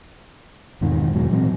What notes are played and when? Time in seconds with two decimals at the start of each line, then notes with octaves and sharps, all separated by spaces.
0.81 E2 G#2 B2 D#3
1.14 E2 G#2 B2 F#3
1.31 A#2 E3 F#3 C4